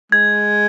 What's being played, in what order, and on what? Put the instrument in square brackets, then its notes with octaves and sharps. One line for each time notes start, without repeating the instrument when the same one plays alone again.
[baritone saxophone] G#3 [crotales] G#6